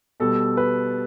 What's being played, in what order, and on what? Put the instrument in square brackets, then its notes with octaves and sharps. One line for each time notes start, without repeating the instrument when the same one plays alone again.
[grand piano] B2 G3 A4
B4